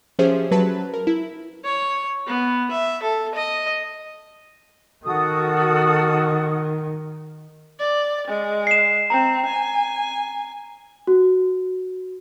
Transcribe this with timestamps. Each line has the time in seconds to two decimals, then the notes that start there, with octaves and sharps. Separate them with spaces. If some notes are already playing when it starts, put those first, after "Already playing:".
0.19 F3 C#4 G4 G#4 C5 E5
0.51 F#3 B4 A5
0.94 A#4
1.07 E4
1.64 C#5
2.27 B3
2.71 E5
3.03 A4
3.35 D#5
5.05 D#3 F#4 A4 D#6
7.79 D5
8.28 G#3
8.67 C7 E7
9.10 C4 A#5
9.46 G#5
11.07 F#4